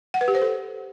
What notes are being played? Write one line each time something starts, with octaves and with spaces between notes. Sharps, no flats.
F#5
B4
G4
C5
A4